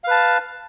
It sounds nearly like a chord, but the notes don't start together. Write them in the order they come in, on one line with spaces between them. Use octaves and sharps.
F5 B4 A5